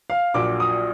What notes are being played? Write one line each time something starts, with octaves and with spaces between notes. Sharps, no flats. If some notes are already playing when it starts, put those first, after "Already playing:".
F5
A#1 A#2 F#3 D6
D#6